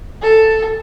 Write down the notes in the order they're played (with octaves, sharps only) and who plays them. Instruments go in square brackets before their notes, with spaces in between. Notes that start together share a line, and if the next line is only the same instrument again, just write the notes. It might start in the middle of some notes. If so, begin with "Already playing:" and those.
[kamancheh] A4